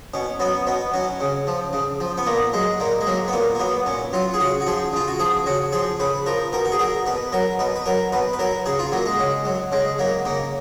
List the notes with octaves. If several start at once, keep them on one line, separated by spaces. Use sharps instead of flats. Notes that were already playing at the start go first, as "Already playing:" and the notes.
B2 C#4
F#3 B3
B2 B3
F#3 C#4
C#3
F3
C#3
F3
B3
A#2 A#3
F#3 G#3
A#2 A#3
G#3
F#3 A#3
B3
A#2 A#3
A#3
F#3 B3
A#2 C#4
F#3 F4
G#4
C#3 F#4
F#4
F3 G#4
C#3 F4
F#4
F3 G#4
C#3 F#4
F3 G#4
C#3 B4
F3 A#4
B2 A#4
F#4
G#4
F#3 A#4
B2 B4
F#3 A#4
B2 B4
B4
F#3 A#4
B2 B4
B4
F#3 A#4
C#3 G#4
F4
F#3 A#3
G#3
C#3
F#3
C#3 G#3
F#3 A#3
C#3 A#3